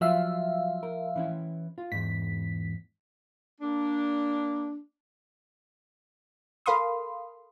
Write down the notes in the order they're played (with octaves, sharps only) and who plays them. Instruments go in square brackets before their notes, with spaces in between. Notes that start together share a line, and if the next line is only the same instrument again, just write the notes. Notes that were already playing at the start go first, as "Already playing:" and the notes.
[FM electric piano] F3 E5 F5 [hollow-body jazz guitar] F#3 F4
[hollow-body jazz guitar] A#4
E3 C#4 E4
F4
[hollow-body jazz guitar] E2 G#2 [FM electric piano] B6
[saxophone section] A#3 D4
[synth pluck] A4 A#4 F5 B5 C6 D#6